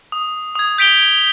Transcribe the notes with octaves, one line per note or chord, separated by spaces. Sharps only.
D#6
D#6 G#6
G6 B6 D7 F7 G7